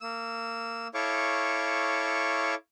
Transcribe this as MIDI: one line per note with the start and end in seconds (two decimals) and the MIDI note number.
0.01 0.88 58
0.01 0.88 88
0.94 2.55 64
0.94 2.55 69
0.94 2.55 73
0.94 2.55 77
0.94 2.55 85
0.94 2.55 86